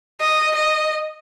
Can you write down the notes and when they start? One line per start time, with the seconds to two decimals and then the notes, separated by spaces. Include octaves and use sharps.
0.20 D#5
0.55 D#5